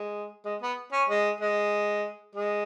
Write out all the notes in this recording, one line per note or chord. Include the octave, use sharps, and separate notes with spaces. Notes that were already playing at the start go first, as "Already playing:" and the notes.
Already playing: G#3
G#3
B3
C#4
G#3
G#3
G#3